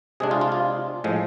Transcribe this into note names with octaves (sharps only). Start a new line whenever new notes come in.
C3 G#3 D4 G#4
F4
F4
F4
A2 F3 G#3